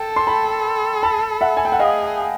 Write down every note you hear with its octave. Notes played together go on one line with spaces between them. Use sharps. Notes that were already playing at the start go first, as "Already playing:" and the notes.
Already playing: A4 G5 A5
C6
A5 B5
A5 B5
E5 F#5
G#5
G5
F#5
G#4 D#5 F5